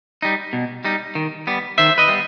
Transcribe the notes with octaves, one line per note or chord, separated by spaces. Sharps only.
G3 D#4
B2
G3 D#4
D#3
G3 B3
D#3 C5 E5
B4 D#5
G3 B3